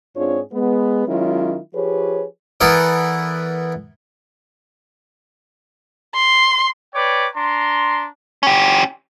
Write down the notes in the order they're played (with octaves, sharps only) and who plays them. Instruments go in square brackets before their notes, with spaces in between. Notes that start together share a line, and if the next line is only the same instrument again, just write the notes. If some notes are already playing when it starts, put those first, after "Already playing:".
[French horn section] G#2 C4 D4 F4 G#4 C#5
G#3 B3
D#3 F#3 G#3 C#4 E4 F4
F3 G4 G#4 B4 C#5
[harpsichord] E3 B3 E4 A4 A#4 D5
[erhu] C6
[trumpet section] B4 C#5 D5 G5 D6
D4 A#5 C6
[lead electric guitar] C#4 G4